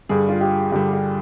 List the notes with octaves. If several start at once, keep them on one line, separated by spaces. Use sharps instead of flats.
G2 D3 G3 G#4
F4
G4
G2 D3 G3 G4
G4